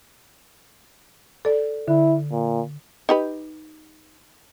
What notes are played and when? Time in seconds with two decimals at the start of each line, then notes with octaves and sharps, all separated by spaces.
1.45 A4 D5
1.88 D3 E4
2.32 A#2
3.09 D#4 G4 B4